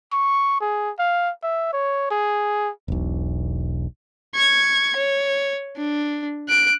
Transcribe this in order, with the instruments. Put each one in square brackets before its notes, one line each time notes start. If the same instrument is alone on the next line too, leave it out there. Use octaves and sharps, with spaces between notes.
[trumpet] C#6
G#4
F5
E5
C#5
G#4
[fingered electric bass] E1 B1
[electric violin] C#6 G#6
C#5
D4
F#6 D7